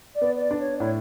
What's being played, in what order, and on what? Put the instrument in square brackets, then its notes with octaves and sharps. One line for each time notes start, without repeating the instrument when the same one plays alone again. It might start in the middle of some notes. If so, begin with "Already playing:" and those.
[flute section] D5
[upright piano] B3
[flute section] D5
[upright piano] D4
[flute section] C#5
[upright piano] A2 [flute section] C#5